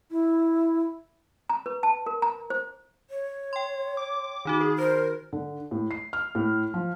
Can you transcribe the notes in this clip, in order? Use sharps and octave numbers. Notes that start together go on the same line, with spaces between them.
E4
A#5
B4
A5
A#4
A#5
C5
C#5
G5 C6
D6
D#3 D#4 F#4
G#4
A#4 C5
D3
A2
C7
F6
A2
F3